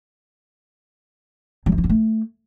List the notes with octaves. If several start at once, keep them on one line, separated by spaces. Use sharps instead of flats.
F#3
F3
E4
B3
A3